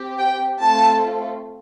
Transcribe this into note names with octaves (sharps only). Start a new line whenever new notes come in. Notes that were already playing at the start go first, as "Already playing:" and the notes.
Already playing: C4 G4
G5
A3 C4 F4 A4 A5